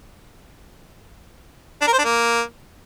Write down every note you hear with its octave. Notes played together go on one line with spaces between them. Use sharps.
D4
A#4
C5
D4
A#3